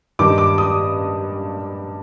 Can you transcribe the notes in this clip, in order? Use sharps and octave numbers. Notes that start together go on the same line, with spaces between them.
G2 D#3 D6
D6
D#6